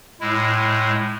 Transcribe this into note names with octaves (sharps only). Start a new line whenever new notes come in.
A2 G#3 E4